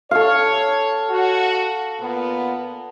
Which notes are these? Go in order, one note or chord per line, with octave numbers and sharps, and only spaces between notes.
A4 C#5 F5
F#4
A#2 B3